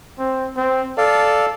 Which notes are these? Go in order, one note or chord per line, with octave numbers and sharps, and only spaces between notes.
C4
C4
A4 D5 F5